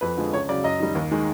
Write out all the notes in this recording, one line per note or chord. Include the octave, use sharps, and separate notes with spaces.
F2 B4
D3 F3 G#3
C#2 C#5
C#3 F#3 D5
F#2 D#5
D#3 G3
D#2
D#3 G#3